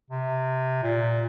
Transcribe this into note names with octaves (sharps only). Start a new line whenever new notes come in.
C3
A#2